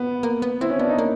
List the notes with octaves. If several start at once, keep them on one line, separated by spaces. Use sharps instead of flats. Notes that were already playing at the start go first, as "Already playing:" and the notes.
Already playing: B3
A#3
B3
C4 E4
C#4
B3 D4
D#4
A#3